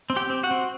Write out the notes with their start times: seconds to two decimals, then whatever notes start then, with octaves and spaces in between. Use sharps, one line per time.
0.10 C4
0.16 G4 G5
0.30 C4
0.43 F#4 F#5
0.51 C4